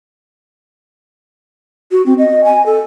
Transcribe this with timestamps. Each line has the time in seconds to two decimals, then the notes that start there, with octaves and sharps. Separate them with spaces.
1.92 F#4
2.06 C4
2.18 D#5
2.44 G#5
2.66 A4